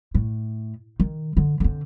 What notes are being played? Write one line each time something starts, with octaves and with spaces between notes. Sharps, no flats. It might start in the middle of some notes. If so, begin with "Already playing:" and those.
A2
D#3
D3
D3 C4